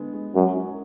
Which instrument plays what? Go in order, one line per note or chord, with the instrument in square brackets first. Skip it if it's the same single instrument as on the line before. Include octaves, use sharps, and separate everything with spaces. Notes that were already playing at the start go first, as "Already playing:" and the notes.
Already playing: [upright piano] D3 G#3 B3
G#3
[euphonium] F#2 [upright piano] F#4
[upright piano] C#4